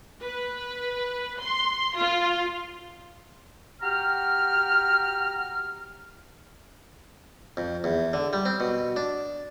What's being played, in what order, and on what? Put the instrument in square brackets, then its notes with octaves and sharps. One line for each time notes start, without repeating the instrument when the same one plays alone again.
[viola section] B4
C6
F4
[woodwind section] F#4 G4 G5 A#5 F6
[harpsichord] F2
E2
D3
G3
C4
B2
D4